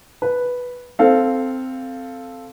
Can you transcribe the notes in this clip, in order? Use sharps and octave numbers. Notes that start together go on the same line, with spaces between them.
B4
C4 A4 F5